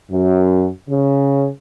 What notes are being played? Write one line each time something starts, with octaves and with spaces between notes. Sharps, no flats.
F#2
C#3